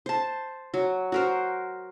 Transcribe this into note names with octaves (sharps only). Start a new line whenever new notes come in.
C5 A5
F#3
F#4 A#4 C5